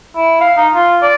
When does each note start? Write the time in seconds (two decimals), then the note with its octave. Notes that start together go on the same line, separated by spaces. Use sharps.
0.16 E4
0.41 F5
0.57 D#4
0.74 F4
1.02 D5